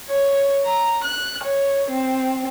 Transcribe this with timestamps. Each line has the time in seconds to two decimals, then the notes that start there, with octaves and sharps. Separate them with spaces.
0.10 C#5
0.64 A#5
1.04 F#6
1.44 C#5
1.90 C4